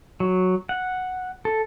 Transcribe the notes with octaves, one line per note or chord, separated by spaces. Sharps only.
F#3
F#5
A4